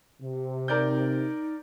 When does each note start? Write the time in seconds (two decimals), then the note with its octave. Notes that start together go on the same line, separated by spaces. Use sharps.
0.22 C3
0.68 D#4 A#4 D5 G6